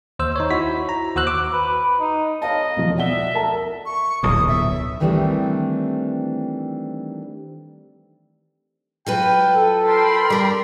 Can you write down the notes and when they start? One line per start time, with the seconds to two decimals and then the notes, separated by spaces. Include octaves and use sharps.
0.19 D#2 C5 E6
0.36 D#4 C5 C#5
0.51 E4 F#4 B6
0.89 A#5
1.16 D#2 F#4 C5 E6 F#6
1.27 D6
1.53 B4
2.00 D#4
2.42 C#5 D#5 F5 A5
2.77 B1 E2 F3
2.98 D5 E5 F#5 G7
3.34 A#4 A5 A#5
3.86 C#6
4.23 D1 B1 A#2 D#6
4.48 E5
5.00 D#3 E3 G3 A3 C4 D4
9.06 F#3 F4 B4 G5
9.54 A4
9.86 A#4 G5 A5 B5 C6
10.30 G3 A#4 D5